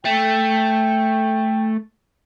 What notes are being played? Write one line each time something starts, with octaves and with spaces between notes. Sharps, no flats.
A3 G5